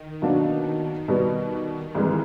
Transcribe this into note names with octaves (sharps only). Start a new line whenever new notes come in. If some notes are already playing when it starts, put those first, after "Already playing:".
Already playing: D#3
B2 F#3 A#3 D4 F#4
B2 G3 B3
C2 C3 E3 G#3